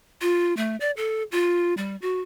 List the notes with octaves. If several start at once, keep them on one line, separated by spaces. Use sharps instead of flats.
F4
A3
D5
A4
F4
G3
F#4